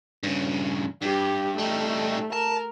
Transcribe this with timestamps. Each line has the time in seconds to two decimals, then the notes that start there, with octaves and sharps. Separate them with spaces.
0.23 G2 C#3
1.02 G2 G4
1.58 G3 A3 D#4
2.33 A#4 A5